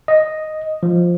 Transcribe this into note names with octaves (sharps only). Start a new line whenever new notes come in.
D#5
F3